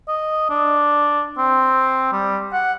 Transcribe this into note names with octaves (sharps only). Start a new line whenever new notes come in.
D#5
D4
C4
G3
F#5